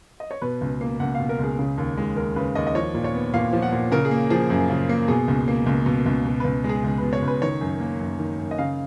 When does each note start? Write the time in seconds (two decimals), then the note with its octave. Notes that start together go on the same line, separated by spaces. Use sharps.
0.20 D#5
0.31 C#5
0.42 B2 B4
0.61 C#2
0.81 A#3
1.00 C#2 F#5
1.15 B2 F5
1.29 A#4
1.39 C#2 G#4
1.59 C#3
1.78 D#2
1.97 G#3
2.16 D#2 A#4
2.36 C#3 B4
2.55 D#2 D#5
2.67 D#5
2.75 F3 C#5
2.94 A#2
3.04 C#5
3.14 B3
3.34 A#2 F5
3.53 F3
3.62 F#5
3.72 A#2
3.92 C#3 A#4
4.05 G#4
4.11 A#3
4.30 F3 G#4
4.50 F#2
4.70 C#3
4.89 A#3
5.08 B2 G#4
5.28 C#2
5.48 A#3
5.66 C#2
5.86 B2
6.06 C#2
6.25 B2
6.40 C#2 B4
6.64 G#3
6.69 G#4
6.84 C#2
6.98 B2 B4
7.13 C#5
7.22 C#2
7.28 B4
7.42 D#3 C#5
7.61 F#2
7.80 A#3
8.00 F#2
8.19 D#3
8.39 F#2
8.51 D#5
8.58 C#3 F5